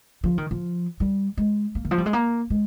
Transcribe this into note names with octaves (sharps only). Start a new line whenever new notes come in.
F3
D#3
F3
G3
G#3
A#3
D#3
F3
G3
G#3
A#3
G#3